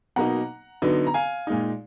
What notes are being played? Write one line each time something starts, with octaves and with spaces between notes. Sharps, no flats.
B2 F#3 A#3 D#4 F#5 A#5
D3 F#3 B3 D#4
A#5
F5 G#5
A#2 G#3 D#4